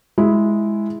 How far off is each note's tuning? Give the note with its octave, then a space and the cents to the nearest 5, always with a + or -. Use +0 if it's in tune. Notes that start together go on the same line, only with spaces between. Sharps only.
G#3 +5 E4 +0